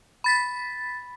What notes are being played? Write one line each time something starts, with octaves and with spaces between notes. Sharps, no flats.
B5 A6 B6